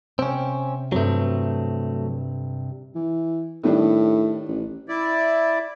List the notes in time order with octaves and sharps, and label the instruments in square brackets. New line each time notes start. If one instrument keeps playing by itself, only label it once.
[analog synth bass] C3 [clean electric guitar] C4 C#4 [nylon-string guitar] G5
[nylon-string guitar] G2 C4 [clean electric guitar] F#3 A3
[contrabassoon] E3
[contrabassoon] A2 [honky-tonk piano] D#3 G3 D4
[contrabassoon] A1
[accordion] E4 D5